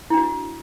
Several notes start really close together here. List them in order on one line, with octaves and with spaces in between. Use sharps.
E4 D4 F#4